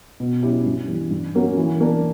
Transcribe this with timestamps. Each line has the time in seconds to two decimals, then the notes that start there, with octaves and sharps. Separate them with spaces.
0.20 B2
0.43 F#3 C#4 E4 G4
0.66 G2
0.88 E3 G3
1.11 G2
1.35 F#3 A#3 C#4 F#4
1.57 E3
1.80 A#3 D4